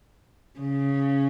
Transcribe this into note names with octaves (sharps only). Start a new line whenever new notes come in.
C#3